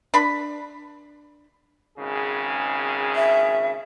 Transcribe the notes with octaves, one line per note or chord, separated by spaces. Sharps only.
D4 B5
G#1 C#3 G#4
E5